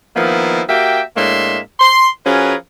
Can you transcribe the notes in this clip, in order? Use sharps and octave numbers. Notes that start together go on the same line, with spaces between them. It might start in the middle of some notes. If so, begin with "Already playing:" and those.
D#3 F3 A#3 B3 D#4 E4
A#3 F#4 G4 E5 G5
A2 G#3 A#3 D4 E5 C6
C6
F3 C#4 F#4 G#4 A#4 B4